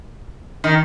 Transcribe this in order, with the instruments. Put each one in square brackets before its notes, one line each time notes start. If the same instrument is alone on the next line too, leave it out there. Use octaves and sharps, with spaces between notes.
[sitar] D#3